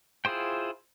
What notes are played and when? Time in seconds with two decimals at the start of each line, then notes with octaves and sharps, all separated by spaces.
0.25 E4 F4 G#4 C5 G5